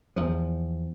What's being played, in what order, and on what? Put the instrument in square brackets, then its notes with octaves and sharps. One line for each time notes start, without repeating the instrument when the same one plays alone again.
[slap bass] E2 F3